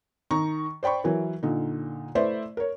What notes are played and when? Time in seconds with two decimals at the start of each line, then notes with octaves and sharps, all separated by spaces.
0.31 D#3 A#5 C#6
0.83 C5 D5 G5 B5 C#6
1.04 E3 F#3 E4 A#4
1.43 A#2 D3 D#4
2.15 A3 E4 B4 C5 D5 E5
2.57 A#4 C#5